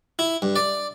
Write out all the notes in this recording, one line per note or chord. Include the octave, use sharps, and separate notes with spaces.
E4
G2
D5